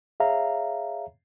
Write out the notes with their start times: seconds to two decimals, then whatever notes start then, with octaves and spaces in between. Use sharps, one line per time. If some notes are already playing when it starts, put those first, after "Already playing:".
0.20 G#4 C#5 E5 F5 A#5